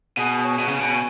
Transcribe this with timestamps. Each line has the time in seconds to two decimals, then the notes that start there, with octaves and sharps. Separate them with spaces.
0.17 B2 G#4
0.44 C#5
0.59 B2
0.69 C#3 G#5
0.80 B2